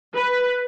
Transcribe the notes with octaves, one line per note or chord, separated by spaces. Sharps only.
B4